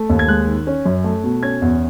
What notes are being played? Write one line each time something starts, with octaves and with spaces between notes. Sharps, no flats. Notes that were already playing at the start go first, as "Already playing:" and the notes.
Already playing: A3
D#2
G#6
G#3 F#6
D#3
C#4
F#2
A3
B2
C#4 G#6
E2